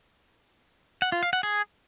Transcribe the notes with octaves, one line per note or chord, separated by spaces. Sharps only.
F#5
F4
F5
F#5
G#4